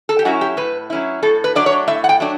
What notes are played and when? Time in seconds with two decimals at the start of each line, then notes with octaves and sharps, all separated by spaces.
0.09 A4
0.19 G4
0.25 F#3 C#4 E4 F#4
0.41 G4
0.57 A2 B4
0.90 F#3 C#4 E4
1.22 A2 A4
1.44 B4
1.55 F#3 A3 D4 D5
1.66 C#5
1.88 A2 E5
2.04 F#5
2.09 G5
2.20 F#3 A3 D4